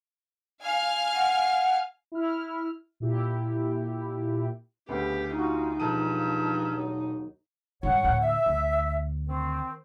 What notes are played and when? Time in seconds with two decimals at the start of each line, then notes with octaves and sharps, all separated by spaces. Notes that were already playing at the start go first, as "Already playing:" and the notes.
0.62 F5 G#5 F6
1.15 F#5
2.12 E4 F6
3.00 A#2 E4 G4
4.89 D2 C#3 B3 G4
5.36 D#4 F4 F#4
5.80 E1 G2 F3 A5 D#7
6.74 D#2 F#3
7.83 G#1 G2 C#5 F#5
8.04 D2 A2
8.22 E5
8.46 D2
9.27 D#3 C4